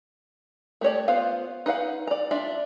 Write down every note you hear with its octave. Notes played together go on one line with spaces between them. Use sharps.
A3 G4 C#5 D5
B3 F4 C5 F5
D#4 B4 F5 F#5
D5 A#5
D4 F4 D5 E5